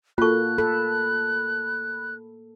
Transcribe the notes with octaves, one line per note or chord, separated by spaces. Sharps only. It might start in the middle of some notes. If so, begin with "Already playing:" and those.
A#3 F4 F#4 A4 C#6 F#6
A4 B5